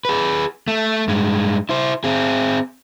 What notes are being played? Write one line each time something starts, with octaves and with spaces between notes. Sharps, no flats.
G#4 B4
A3
G2 G#3
E4 C5
C4 G#4